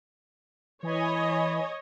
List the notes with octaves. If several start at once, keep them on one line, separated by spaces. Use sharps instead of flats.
E3 C#5 D#5 G#5 B5